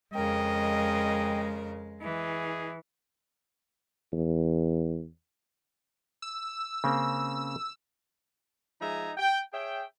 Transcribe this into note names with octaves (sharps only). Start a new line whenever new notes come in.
F2 C#3 G#3 A#4 D#5 G5
E3 G#4 D#5
E2
E6
C#3 A#3 C4
F3 G#3 D#4 E5 G#5 A#5
G5
G#4 C#5 E5 G5